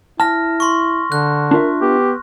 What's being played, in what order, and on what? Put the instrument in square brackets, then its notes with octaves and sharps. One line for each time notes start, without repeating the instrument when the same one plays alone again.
[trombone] E4 [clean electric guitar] A5 [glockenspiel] F6 A#6
[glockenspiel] C6 C#6
[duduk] D3 [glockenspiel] F#6
[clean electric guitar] D4 F4 E5 [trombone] A#4
[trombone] B3 [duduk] G4